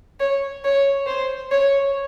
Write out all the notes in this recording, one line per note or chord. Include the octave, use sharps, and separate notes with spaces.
C#5
C#5
C5
C#5